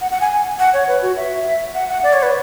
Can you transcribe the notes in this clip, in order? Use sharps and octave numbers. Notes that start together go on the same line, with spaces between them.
F#5
F#5
G#5
F#5
C#5
B4
F#4
E5
F#5
F#5
D5
C#5
B4